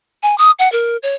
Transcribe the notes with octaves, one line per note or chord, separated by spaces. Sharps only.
G#5
D#6
F#5
A#4
C#5